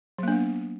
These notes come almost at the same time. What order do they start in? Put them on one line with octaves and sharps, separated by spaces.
F#3 A#3 D4 B3